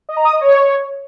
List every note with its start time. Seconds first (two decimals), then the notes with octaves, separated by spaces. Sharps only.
0.09 D#5
0.17 A#5
0.25 D#6
0.33 D#5
0.41 C#5